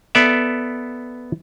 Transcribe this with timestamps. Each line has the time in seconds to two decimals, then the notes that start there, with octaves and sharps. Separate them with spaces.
0.15 B3 A4 D5 E5